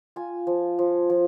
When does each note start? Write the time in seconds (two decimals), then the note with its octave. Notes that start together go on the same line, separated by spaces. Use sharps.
0.16 F4 G#5
0.47 F3
0.79 F3
1.10 F3